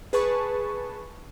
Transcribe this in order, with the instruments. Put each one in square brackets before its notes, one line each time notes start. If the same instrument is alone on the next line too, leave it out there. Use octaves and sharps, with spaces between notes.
[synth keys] G#4 B4 A5 C#6